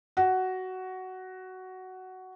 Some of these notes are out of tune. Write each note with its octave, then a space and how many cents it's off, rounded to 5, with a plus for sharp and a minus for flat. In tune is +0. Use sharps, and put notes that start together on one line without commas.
F#4 +10